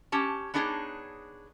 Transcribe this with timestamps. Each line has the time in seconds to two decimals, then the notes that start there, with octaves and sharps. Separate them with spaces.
0.12 C#4 G4 A5
0.54 B3 D4 D#4 G#4 B4 C#5